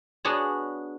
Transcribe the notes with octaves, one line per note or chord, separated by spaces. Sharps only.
B3 D4 F#4 G#4 C#5